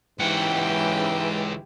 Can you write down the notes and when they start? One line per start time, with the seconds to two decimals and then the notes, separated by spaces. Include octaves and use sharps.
0.20 C#2 G#2 E3 G4 F#5 G5